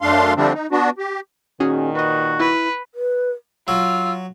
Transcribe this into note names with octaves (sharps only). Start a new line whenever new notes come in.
F#2 A3 D4 F5 C6
D3 F3 G3 A3 C4 D4
D#4
B3 D4 F#4
G4
A#2 D#3 C#4 F#4 G#4
F#4 B4 D#5
E4 B4
B4
F#3 F4 E6